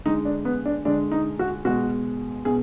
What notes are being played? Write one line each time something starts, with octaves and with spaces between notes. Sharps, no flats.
D3 G#3 D#4
D4
B3
D4
D3 G#3 D4
D#4
F#4
B2 G#3 F#4
B2 G#4